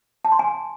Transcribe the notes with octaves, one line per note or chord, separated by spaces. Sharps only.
A5
C6
G#5